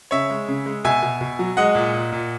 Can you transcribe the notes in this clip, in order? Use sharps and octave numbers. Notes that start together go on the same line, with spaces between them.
C#3 C#5 E5
G#3
C#3
G#3
B2 E5 G#5
B2
B2
F#3
G#3 D#5 F#5
A#2
A#2
A#2